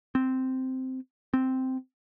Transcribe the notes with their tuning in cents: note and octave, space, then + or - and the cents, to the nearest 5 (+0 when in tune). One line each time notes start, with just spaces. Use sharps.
C4 -10
C4 -5